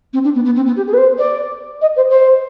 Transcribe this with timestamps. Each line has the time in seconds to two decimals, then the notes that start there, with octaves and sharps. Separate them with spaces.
0.13 C4
0.24 D4
0.35 B3
0.45 B3
0.55 C4
0.66 B3
0.76 G4
0.87 G#4
0.93 B4
0.97 C5
1.18 D5
1.81 D#5
1.96 C5
2.10 C5